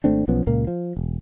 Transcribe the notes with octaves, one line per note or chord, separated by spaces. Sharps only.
G#1 A3 C4 D4
B1 F3 B3 C#4
C#2 A#2 A#3
F3
E1